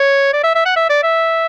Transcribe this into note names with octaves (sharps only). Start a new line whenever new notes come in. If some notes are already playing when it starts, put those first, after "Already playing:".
Already playing: C#5
D5
E5
E5
F#5
E5
D5
E5